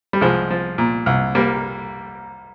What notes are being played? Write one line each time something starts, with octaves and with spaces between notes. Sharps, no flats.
G3
C2 F3 G#3
F3
A#2
C2
G3 A#3